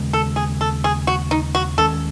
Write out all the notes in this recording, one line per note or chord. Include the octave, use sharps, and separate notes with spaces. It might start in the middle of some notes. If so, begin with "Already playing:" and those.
Already playing: D#2 C#3 G#3 B3
A4
G#4
A4
G#4
F#4
D#4
F#4
D#2 D#3 G#3 C#4 A4